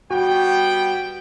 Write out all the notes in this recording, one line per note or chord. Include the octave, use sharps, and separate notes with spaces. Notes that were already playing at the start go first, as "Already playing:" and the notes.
G3 B3 F#4 G5